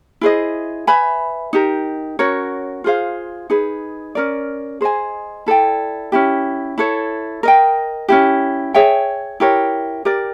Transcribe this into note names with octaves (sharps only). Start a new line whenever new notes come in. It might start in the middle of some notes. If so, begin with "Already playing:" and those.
E4 G#4 C5 D#5
B4 E5 G#5 B5
D#4 G4 A#4
C#4 F#4 A#4 C#5
F4 G#4 C5 F5
D#4 G#4 B4
C#4 F4 A#4 D5
G#4 C5 D#5 G#5
E4 A4 D5 G5
C#4 E4 G4
E4 A4 C#5
A#4 D#5 G5
C#4 E4 G4
G#4 C#5 E5 G5
E4 G4 A#4 C#5
G4 A#4 D5